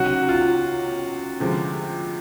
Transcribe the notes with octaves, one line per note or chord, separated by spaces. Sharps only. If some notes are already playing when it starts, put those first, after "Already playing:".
Already playing: C#2 C3 D#3 F#3 F#4
F4
D2 C3 F3 G#3